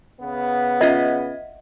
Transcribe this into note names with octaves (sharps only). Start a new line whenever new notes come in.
C#3 B3
C#4 F4 D#5 E5 F#5 G#6